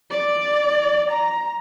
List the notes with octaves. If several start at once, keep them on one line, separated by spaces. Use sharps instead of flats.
D5
A#5